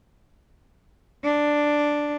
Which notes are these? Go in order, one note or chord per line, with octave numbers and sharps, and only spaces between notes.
D4